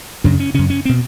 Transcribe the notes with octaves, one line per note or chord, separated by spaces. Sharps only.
F#2 C#3 D4
C#4
F#2 C#3 C#4
C#4
C4
B2